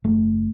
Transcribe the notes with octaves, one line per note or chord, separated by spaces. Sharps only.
F#1 A3